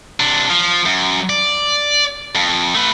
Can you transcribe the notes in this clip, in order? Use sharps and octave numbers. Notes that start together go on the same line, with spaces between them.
C3 D4
F3
F#2
D5
F2
A3 B4